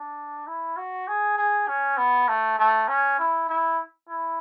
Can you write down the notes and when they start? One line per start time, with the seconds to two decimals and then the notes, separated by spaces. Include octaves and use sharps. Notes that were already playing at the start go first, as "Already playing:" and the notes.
Already playing: D4
0.47 E4
0.77 F#4
1.08 G#4
1.38 G#4
1.68 C#4
1.97 B3
2.28 A3
2.59 A3
2.88 C#4
3.19 E4
3.49 E4
4.09 E4